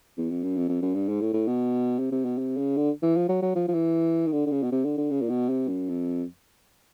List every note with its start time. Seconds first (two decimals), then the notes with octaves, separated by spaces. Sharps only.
0.17 E2
0.30 F2
0.43 F#2
0.57 F2
0.69 F2
0.82 F#2
0.95 G2
1.09 G#2
1.21 A2
1.33 A2
1.47 B2
1.99 C3
2.12 C3
2.25 B2
2.38 C3
2.57 C#3
2.77 D3
3.02 E3
3.16 F3
3.29 F#3
3.42 F#3
3.55 F3
3.68 F3
3.74 E3
4.27 D#3
4.32 D3
4.46 D3
4.52 C#3
4.63 B2
4.72 C3
4.85 D3
4.97 D3
5.11 C#3
5.22 A#2
5.29 B2
5.49 C3
5.69 F#2
5.89 F2